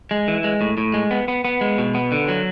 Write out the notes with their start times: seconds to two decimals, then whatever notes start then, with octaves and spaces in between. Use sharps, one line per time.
0.11 G#3
0.28 E3
0.44 G#3
0.61 A2
0.78 A2
0.94 G#3
1.11 B3
1.28 B3
1.45 B3
1.61 G#3
1.78 B2
1.95 B3
2.12 D3
2.28 F#3